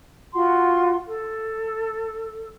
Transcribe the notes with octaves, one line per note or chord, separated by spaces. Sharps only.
F4 F#4 F#5 C6
A4